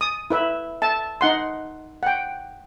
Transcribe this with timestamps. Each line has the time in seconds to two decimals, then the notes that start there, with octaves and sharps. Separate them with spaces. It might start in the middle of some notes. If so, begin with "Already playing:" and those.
0.01 D#6
0.30 E4 B4 E5
0.82 E5 A5
1.21 D#4 F#5 C6
2.03 F#5 G5